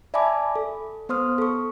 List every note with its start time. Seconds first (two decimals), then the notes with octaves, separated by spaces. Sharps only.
0.14 D5 E5 G#5 A5 B5 D6
0.56 A4
1.09 B3 C5 C6 D#6 F6
1.38 A4 C#6